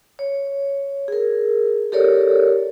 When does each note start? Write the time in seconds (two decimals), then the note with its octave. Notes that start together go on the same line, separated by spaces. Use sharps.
0.19 C#5
1.08 G#4 A#4
1.92 G4 A4 A#4 C#5 D5